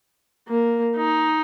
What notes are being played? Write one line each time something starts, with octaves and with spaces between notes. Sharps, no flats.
A#3
D#4